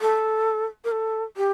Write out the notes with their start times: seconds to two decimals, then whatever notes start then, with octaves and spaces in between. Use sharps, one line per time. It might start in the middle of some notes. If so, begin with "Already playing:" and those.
0.01 A4
0.84 A#4
0.91 A4
1.37 G4